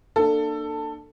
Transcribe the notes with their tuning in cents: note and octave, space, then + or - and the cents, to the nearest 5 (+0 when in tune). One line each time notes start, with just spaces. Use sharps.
A#3 -5 D4 +30 A4 +15